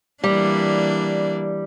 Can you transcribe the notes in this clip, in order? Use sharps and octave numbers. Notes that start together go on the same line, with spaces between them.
E3 G3 A#3 D4